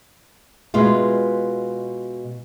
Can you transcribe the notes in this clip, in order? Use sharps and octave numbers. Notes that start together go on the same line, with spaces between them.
B2 G#3 F4